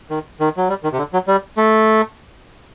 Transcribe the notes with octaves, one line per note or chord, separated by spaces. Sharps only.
D#3
D#3
F#3
G3
D#3
C3
D3
F#3
G3
A3